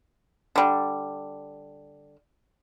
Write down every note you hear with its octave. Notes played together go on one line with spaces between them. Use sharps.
D3 G3